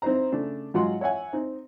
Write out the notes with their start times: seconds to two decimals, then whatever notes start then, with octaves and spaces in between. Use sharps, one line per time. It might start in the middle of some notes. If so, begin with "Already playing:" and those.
0.02 C4 D#4 E4 C5 A#5
0.32 C#3 A3 D4
0.74 G#2 F#3 F4 F#5 C6
1.01 C#5 E5 F#5 G#5
1.33 C4 D#4